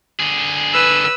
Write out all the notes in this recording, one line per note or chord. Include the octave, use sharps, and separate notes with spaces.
D3 G#4
B4 E6